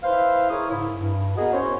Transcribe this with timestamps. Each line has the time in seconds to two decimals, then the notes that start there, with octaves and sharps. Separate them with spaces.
0.03 E4 B4 C5 E5 F5
0.50 E4 G#4 A#4 C#5 D#6
0.70 G#2 C#3 E4
0.93 G2
1.36 B3 F#4 G#4 A#4 D#5
1.53 C#4 E4 C5 C#5